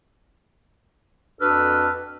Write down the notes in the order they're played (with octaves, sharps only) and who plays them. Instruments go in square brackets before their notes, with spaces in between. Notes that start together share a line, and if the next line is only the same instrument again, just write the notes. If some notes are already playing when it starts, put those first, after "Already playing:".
[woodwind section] F2 D4 F#4 A4 B4 F6